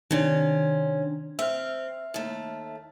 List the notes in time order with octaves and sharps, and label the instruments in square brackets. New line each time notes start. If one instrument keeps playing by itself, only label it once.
[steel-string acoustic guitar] C3 C#4 [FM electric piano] D#3 D4
[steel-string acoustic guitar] C4 [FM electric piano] E5 F6
[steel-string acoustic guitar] D#2 A3